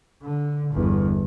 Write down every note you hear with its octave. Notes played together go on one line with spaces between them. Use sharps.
D3
G1 E2